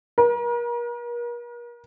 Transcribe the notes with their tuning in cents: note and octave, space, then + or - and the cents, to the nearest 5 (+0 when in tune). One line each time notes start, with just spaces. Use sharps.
A#4 +40